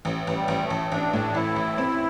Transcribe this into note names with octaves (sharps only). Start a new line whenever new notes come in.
A1
A1 E3
G3
A1
A3
A1
A1 D4
A2
A1 E4
A1
C4